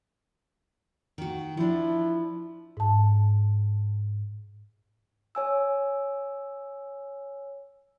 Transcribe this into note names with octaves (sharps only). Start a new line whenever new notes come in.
D#3 F#4
F3 D4 E4
G#2 A5
C#5 G#5 E6